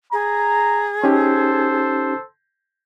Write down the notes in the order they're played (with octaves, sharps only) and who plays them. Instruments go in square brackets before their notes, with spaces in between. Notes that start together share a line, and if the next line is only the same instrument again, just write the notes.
[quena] G#4 [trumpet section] A#5
[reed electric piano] C#4 D#4 G4 [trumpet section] A4 C5